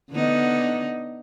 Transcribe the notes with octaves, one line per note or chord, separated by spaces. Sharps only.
D3 B3 D#4